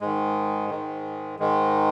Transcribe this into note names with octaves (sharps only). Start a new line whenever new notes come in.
G#2 D#3 G#3
G#2 D#3 G#3
G#2 D#3 G#3